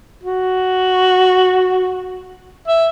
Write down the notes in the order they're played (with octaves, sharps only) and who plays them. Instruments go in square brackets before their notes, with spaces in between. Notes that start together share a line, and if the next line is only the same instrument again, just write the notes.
[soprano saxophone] F#4
E5